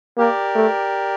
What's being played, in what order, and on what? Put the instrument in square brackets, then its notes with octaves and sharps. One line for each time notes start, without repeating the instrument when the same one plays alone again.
[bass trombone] A#3 [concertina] G4 A#4 D5
[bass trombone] A3